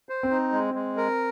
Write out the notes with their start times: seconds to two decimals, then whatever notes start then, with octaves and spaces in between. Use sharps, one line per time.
0.09 C5
0.23 C4
0.31 D#4
0.52 G#3
0.74 G#3
0.97 A#4